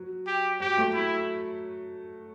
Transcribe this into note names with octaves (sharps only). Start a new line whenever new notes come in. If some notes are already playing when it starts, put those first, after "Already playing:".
Already playing: F#3
G4
F#3 G4
F#3 A3
E4